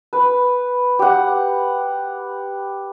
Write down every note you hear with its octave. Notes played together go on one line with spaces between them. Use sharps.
B4
G4 F#5